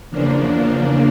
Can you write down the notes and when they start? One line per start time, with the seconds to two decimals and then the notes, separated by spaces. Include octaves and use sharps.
0.10 E2 C#3 F3 A#3 D4